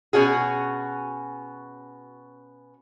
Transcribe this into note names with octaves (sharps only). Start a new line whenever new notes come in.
B2 C#4 F#4 G#4